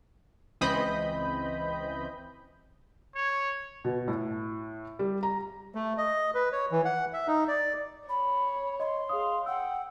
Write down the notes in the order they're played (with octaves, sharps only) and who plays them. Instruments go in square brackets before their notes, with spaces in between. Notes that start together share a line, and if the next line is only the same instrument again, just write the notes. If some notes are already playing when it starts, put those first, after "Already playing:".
[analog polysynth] C#2 E3 C4 D#5 B5 G6
[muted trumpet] C#5
[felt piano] B2
A2
G3
A#5
[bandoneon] A3
D#5
B4
C#5
E3
F#5
E5
D#4
D5
[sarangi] C#5 [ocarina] B5
[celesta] D#5 [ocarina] C6
[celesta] G#4 C#5 D#6 [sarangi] F5
[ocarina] F#5 [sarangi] G5 [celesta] E6